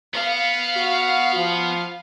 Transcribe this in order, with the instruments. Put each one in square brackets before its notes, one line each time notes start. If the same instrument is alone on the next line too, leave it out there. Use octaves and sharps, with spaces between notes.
[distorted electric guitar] B3 [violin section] F5
[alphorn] F#4
F3